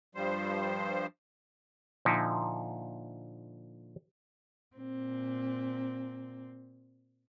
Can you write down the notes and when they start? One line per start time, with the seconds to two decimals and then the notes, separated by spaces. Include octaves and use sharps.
0.15 G2 F3 G3 C5
2.05 A#2 D3 F3 D#4 E4
4.76 A#2 C4